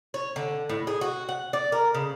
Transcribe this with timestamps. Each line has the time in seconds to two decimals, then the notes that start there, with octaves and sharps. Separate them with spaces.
0.14 C#5
0.36 D3
0.69 A2
0.87 G#4
1.01 F#4
1.29 F#5
1.53 D5
1.72 A#4
1.94 C#3